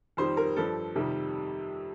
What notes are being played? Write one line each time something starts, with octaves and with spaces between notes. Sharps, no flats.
F2 D#3 G3 C5
A#4
G2 F3 A4
F2 C3 D#3 G3